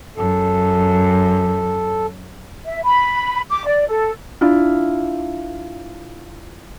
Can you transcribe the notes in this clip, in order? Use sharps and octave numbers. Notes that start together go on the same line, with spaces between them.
F#2 A4
E5
B5
D6
D5
A4
D4 E4 F4